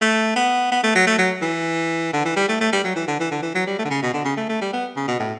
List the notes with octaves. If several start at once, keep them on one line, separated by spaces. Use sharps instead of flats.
A3
B3
B3
A3
F#3
A3
F#3
E3
D3
E3
G3
A3
A3
G3
F#3
E3
D3
E3
D3
E3
F#3
G3
A3
D3
C#3
B2
D3
C#3
A3
A3
G3
B3
C#3
B2
A2